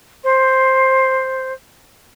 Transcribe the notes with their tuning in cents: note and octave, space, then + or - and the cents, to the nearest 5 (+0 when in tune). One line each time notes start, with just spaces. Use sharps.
C5 +5